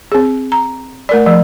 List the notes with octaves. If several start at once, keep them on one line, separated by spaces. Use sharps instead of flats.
C4 G#4
A#5
A3 A#4 D5
F3 A3